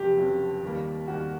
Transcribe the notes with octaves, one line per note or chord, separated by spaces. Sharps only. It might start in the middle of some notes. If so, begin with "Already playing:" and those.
Already playing: F1 F2 C#3 F#3 G4
F1 F2 C#3 F#3
D#2 D#3 G3 A#3
D#2 D#3 G3 A#3 F#4